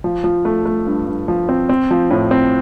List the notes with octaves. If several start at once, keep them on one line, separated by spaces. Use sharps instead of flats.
F3
F3
A3
A3
G2
G2
F3
C4
C4
F3
A2
C4